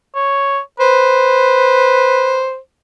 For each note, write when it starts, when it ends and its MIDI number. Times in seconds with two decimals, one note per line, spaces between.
0.15 0.59 73
0.80 2.48 71
0.80 2.57 72